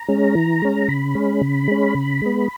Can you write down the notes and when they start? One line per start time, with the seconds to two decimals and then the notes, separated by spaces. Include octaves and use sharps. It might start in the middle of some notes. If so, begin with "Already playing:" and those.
Already playing: A#5
0.08 G#3 C#4
0.35 E3
0.62 G#3 C#4
0.88 C#3 B5
1.15 G#3 C#4
1.41 C#3
1.68 G#3 C#4
1.94 C#3
2.22 G#3 B3